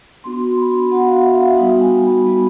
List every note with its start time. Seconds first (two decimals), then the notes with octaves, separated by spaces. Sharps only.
0.24 B3 D4 F#4 C6
0.58 B5
0.91 B3 D4 F#4 F#5
1.08 F5
1.25 E5
1.42 F5
1.58 G3 B3 D#4 F#4 G5
1.80 G#5
2.03 B5
2.25 G3 B3 D#4 F#4